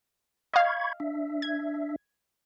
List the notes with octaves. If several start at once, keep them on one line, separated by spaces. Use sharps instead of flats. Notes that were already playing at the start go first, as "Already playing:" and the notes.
D#5 F5 B5 C#6 G#6
D4 E5
G#6